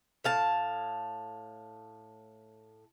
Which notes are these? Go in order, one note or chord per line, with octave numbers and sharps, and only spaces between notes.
A2 F5 A5